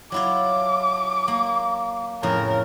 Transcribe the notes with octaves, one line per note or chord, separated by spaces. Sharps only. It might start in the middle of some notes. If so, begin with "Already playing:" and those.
F#3 E4 F4 D6
A#3
F2 A2 C#3 A#4